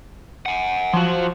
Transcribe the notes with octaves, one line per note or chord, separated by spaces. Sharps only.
F#5 G#5
F3 F#3 F#4